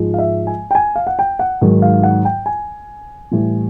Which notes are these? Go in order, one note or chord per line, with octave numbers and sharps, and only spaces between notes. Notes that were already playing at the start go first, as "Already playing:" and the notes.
Already playing: G#2 F3 G#3
F5
E5
G#5
G5
G#5
F5
F#5
G5
F#5
G#2 D#3 F#3
F5
F#5
G5
G#5
A2 E3 G3